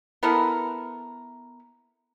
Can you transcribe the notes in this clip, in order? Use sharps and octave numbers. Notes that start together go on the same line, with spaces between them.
B3 E4 A4 A#4